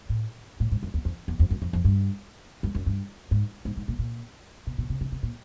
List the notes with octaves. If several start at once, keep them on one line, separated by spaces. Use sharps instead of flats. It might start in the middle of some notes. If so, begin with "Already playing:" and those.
A2
A2
G#2
F#2
E2
F2
E2
F2
F#2
F2
F2
G2
G2
F#2
G2
G#2
G#2
G#2
A#2
A#2
B2
B2
C3
C#3
C3
A#2